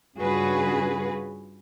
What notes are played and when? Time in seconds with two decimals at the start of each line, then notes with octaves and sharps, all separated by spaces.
0.18 G2 C#3 F4 F#4 G#4 B4